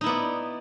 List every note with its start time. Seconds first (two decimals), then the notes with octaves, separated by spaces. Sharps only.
0.01 D#4
0.04 E4
0.06 B3
0.09 D5